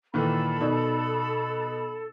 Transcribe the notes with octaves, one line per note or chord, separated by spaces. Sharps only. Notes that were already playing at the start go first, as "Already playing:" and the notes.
A#2 D#3 E3 A4 B5
B2 D#4 A#4 D5